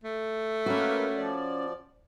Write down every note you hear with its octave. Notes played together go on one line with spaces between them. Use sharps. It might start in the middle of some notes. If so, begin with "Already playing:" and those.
A3
A#3 C#4 F#4 A#4 B4
F3 D5